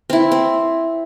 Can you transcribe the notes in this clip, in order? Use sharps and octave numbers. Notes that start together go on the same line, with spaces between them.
C4 E4
C4